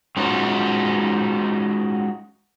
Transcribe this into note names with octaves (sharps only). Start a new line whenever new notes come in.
G#3 C#4 D#4 F4 F#4